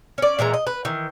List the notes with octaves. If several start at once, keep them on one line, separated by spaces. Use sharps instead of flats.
C#4 D5
A#2 E3 G#3 A#5
D#5
B4
D#3 E3